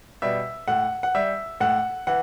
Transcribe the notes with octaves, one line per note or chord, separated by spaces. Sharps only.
B2 G3 E5
A2 F#5
F#5
G3 E5
A2 F#5
E3 F#5